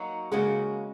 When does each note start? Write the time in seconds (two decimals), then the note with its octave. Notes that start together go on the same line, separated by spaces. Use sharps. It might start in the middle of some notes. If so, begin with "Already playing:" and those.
Already playing: F#3 A#3 D#4 F#4
0.31 C#3 G#3 A#3 C#4 F#4